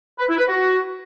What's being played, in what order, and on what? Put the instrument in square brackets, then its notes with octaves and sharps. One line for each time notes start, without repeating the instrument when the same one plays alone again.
[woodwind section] B4
E4
B4
F#4